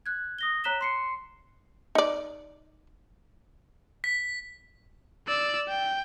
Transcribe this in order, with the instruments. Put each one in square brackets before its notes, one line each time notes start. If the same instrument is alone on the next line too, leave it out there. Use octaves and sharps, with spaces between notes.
[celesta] F#6 G#6
D#6 A#6 G7
C#5 A#5 F#6 B6 E7 G7
C6 C7 C#7
[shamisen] D#4 D5
[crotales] B6
[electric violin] D5 E6
G5